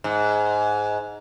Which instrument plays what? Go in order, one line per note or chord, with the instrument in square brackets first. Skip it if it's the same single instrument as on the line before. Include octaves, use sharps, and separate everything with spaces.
[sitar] G#2